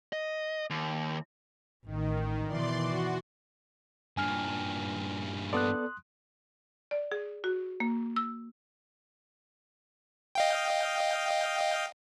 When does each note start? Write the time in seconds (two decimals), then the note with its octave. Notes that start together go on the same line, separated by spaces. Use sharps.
0.13 D#5
0.70 D#2
1.86 A1 D#3
2.47 B2 E3 D5 C6
2.82 F#4
4.17 G2 A#2 G#5 F6
5.53 B3 A4 D5 C6 D#6 F#6
6.91 D5
7.12 G#4
7.44 F#4
7.80 A#3
8.16 E6
10.35 D#5 F5 G5